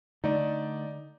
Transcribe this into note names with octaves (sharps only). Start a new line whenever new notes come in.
D3 A3 D#4 D5